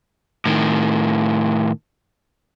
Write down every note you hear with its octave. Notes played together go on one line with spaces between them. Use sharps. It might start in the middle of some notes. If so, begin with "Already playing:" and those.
A2 D#3